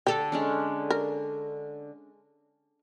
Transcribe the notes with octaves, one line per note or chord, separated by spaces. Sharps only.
D3 G4 A4
G#3 C#4 D4
A#4